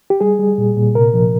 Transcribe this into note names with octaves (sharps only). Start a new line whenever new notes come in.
G4
G3 G#4
G3
A#2
A#2
C3 A#4
F3